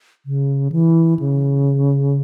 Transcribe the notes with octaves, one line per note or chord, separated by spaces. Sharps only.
C#3
E3
C#3